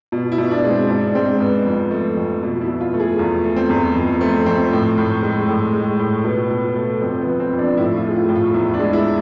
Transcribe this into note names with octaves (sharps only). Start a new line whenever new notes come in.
B2
E4
B2
D4
G#3
C4
G#2 D4
D4
G#3 C4
G#2 B3
F2
A3
F2
B2
E4
B2
F4
A3
G#4
E2 F4
A3
C4
E2
F2
A3 C4
F2 C4
A2
A2
G#3
A2
G#3
A2
B2 B3
B2
A3
F2 C4
B3
F3
C4
F2
D4
A2 E4
F4
A3 G#4
F4
A2
F4
E2 E4
D4
G#3
E4